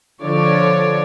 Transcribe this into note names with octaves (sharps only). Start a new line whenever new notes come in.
D3 F3 C#5 D5